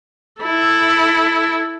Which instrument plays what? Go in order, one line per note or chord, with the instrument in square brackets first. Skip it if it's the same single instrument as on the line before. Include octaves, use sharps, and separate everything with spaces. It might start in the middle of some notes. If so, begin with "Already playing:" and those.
[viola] E4 A4